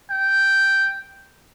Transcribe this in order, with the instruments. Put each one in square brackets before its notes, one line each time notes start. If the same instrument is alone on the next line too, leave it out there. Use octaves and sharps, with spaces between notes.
[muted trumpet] G5